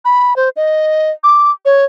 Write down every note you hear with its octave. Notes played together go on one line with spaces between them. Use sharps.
B5
C5
D#5
D6
C#5